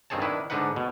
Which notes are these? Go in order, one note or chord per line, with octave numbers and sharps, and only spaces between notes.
G2 D#3 C4 G#4 C#5 A5
D#3 D4 E4 B4
G#2 D3 D4 D#4 B4 F#5
B2